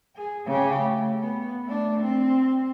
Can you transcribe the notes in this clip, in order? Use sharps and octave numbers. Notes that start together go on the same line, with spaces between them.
G#4
C#3 G4
A3
B3
A3 D4
C4